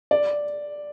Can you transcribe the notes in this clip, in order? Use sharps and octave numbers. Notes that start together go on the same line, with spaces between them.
D5